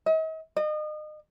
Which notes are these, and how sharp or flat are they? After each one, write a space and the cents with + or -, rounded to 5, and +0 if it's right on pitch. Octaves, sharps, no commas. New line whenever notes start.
D#5 +40
D#5 -35